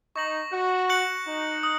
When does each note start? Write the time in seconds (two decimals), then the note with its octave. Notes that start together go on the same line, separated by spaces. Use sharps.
0.16 D#4 C#6 A#6 F#7
0.53 F#4
0.90 F#6 C#7 F#7
1.27 D#4
1.63 D#6